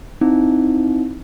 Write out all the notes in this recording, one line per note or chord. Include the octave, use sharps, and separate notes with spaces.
C4 D#4 E4